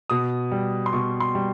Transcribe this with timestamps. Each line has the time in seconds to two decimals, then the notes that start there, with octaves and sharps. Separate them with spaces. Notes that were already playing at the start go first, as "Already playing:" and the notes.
0.10 B2 D#6
0.52 G3
0.86 C6
0.93 B2 C#6
1.20 C6
1.35 G3